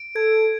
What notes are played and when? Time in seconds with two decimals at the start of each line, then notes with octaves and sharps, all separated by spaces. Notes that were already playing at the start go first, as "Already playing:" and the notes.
Already playing: D7
0.15 A4 G#6